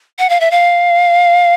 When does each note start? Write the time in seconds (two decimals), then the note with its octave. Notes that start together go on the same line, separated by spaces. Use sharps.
0.19 F#5
0.29 F5
0.40 E5
0.51 F5